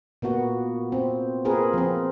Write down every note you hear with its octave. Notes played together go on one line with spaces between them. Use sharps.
A#2 A#3 B3 F#4
C4
A#3 C4 F4 G#4 A#4 B4
F3 C4